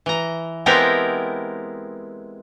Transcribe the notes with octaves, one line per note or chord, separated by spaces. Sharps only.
E3 A#5
G#3 B3 C4 E4 G4 A#4